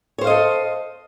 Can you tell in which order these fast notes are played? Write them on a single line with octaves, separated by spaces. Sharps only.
C#5 C5 F5 D#5 A4